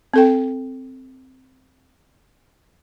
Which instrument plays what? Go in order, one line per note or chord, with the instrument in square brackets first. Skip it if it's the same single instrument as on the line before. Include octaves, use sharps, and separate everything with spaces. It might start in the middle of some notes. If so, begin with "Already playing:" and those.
[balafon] C4 A4 G5